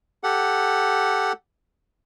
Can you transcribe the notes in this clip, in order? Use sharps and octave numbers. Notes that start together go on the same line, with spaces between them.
G4 A4 F#5